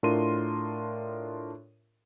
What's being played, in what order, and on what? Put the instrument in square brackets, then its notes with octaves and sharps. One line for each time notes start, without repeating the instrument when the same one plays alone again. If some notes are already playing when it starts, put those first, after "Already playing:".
[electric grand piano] A2 D4 F4 A#4 C6 D#7